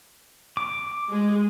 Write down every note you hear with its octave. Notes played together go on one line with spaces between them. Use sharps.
D6
G#3 G#4